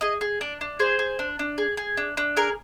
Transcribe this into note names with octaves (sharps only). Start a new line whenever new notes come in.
G#4 D#5
G#4
D4 D5
D4
G#4 C5
G#4
D4
D4
G#4
G#4
D4
D4
G#4 A#4